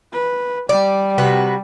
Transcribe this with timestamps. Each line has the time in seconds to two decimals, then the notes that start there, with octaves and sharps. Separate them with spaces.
0.12 B4
0.69 G3 D5
1.18 C3 F#4 B4